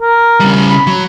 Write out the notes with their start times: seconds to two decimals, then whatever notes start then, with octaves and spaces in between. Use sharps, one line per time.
0.01 A#4
0.40 C#3 G3
0.69 B5
0.87 F#3